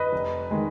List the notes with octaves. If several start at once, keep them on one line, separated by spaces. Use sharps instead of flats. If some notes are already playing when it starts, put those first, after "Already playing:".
Already playing: B4 D#5
F1
D#3 G#3